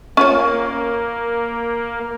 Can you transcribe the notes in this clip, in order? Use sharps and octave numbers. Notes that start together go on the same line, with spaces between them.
A#3 C#4 F4 C#5